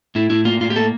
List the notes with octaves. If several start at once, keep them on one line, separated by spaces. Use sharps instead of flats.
A2 E4
A2 E4
A#3 F4
A2 F4
G4
A#3 A4